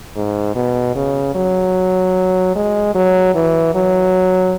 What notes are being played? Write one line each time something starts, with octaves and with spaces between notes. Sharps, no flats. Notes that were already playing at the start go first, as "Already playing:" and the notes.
G#2
B2
C#3
F#3
G#3
F#3
E3
F#3